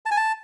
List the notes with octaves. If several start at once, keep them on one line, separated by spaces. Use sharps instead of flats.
A5
G#5
A5